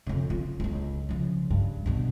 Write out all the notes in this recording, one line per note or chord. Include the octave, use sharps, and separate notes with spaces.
F2 C#3
F4
E1 C#2
C#3 F3
G2
G2 B2